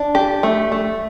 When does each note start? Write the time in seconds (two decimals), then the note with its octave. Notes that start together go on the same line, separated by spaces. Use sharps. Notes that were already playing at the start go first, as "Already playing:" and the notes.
Already playing: D4
0.15 G4
0.43 A3
0.72 A3